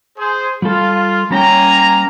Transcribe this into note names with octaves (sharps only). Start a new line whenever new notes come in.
G#4 C5
G3 F4 A4
G3 A#3 C#4 G5 G#5 A#5